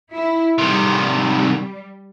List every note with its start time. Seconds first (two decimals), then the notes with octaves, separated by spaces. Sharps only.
0.12 E4
0.58 C3 D#3 G3